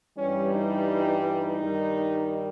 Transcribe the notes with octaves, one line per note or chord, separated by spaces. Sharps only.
G2 E3 G3 C#4
D#4
D#4
G2 D#3 G3